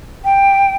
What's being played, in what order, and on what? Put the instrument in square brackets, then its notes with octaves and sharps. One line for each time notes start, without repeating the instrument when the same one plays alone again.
[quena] G5